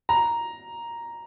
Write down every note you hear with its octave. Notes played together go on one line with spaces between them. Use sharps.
A#5